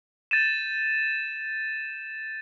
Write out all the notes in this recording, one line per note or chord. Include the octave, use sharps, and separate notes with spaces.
G6 A6 D#7 E7